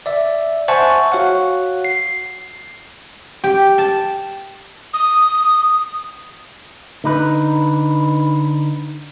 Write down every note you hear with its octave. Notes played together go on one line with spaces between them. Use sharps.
D5 E5
C5 E5 F#5 G#5 A5 C#6
F#4 C#5 F5 F#5
C7
G4
A5
D#6
D3 D#4 B4